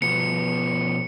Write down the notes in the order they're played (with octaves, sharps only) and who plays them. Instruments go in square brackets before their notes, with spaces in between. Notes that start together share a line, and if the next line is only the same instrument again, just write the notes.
[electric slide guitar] B2 F3 B3 [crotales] C#7